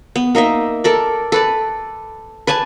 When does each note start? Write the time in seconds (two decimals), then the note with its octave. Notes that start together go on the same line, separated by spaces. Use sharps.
0.16 B3
0.35 A#3 D#4 D#5 E5
0.84 A4 A#4 D5
1.32 A4 B4 D5
2.47 B4 D5 G#5 A5